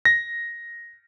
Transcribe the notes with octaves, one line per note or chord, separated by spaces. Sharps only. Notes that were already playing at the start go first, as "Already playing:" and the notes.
A#6